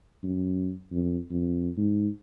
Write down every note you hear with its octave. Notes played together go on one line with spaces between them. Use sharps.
F#2
F2
F2
G#2